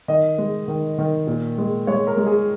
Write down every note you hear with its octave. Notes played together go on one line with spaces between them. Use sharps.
D#3 D#5
G#3
D#3
D#3
A#2
G#3
G#3 C#5
A#4
G#3
G#4